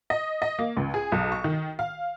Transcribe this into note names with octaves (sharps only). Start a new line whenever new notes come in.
D#5
D#5
A#3
C#2
G#4
B1
C#6
D#3
F5